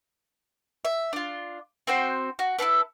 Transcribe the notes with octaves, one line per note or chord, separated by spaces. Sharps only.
E5
D4 F4
C4 F#4 C5 G5
F#4
E4 F4 A4 B4